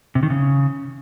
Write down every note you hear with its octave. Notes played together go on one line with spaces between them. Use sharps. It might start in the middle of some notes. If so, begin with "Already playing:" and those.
C3
D#3
C#3